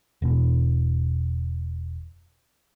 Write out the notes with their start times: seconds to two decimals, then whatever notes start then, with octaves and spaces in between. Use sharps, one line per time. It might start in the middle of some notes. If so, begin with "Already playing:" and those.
0.22 E1 B2